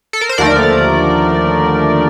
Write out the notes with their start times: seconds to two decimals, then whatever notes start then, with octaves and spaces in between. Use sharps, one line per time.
0.13 A4
0.21 A#4
0.29 C5
0.38 D#2 D3 F3 A3 A#4 D5